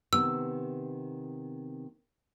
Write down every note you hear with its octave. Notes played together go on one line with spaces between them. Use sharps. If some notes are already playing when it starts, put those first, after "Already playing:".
C3 D#3 B3 E6